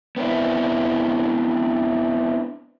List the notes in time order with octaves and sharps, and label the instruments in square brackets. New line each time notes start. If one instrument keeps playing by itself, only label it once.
[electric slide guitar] B3 C4 D4 E4